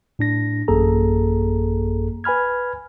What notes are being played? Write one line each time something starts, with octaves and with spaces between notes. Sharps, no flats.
A2 D4 A#6
A1 F#2 A#3 G#4 A4 A#5
B4 G#5 B5 F6 G#6